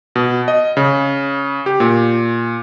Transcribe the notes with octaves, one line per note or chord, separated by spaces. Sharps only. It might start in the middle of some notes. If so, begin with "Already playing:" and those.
B2
D#5
C#3
G4
A#2